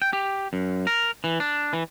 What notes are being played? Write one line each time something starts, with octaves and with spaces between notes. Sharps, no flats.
G5
G4
F#2
A#4
E3
D4
E3